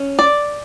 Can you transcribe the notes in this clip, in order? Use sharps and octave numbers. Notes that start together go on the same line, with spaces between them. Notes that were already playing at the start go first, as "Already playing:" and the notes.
Already playing: C#4
D5